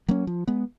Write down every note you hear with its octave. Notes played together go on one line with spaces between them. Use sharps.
F#3 A#3 C#4
F3
G#3 B3